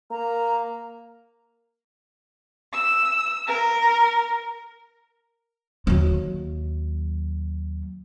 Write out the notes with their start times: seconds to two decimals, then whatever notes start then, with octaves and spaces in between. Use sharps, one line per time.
0.11 A#3 A#5
2.73 E6
3.46 A#4
5.87 D#2 F#3